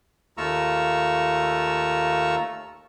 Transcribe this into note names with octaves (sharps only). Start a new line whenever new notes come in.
D#2 A3 F4 A#5 C#6 E6